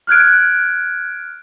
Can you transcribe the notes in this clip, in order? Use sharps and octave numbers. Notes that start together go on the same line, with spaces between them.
F6 F#6 G#6 D7